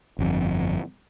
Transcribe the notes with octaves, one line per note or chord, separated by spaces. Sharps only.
G1 F2